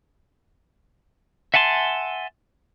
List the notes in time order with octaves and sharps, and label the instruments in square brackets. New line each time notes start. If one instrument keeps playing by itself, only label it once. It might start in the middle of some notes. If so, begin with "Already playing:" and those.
[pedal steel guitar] E5 F#5 G#5 A5 C6